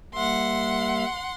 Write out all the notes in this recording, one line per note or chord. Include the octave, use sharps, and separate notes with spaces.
G3 A#3 E5 F#5 C6